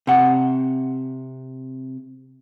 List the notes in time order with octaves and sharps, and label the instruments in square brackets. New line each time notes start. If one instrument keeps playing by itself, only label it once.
[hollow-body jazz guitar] C3 F#5